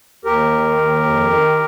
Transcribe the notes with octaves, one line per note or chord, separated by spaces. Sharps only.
D#2 G4 A#4
D#3
D#2
F2
D#3